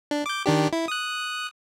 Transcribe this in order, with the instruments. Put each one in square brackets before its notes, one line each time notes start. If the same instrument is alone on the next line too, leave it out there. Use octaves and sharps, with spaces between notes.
[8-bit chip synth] D4
D6 G6
D#3 D4 G4
E4
D#6 F#6